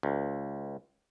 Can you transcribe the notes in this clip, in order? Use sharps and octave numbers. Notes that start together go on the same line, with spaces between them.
C#2